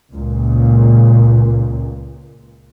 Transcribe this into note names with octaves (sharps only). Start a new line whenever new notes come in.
C#2 A#2